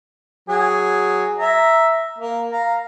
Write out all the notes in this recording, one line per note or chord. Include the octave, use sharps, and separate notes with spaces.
F#3 G#4
E5 A#5
A#3
F5 A#5